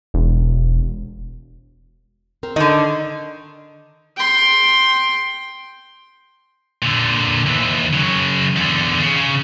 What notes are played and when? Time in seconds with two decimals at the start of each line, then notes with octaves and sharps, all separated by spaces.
0.14 E1
2.43 C4 A#4
2.56 D3 D#3 D#5
4.17 G5 C6
6.82 A#2 D3
7.46 D#2 E3
7.93 C#3 F#3
8.56 E2 D3
8.99 C#3
9.16 C#3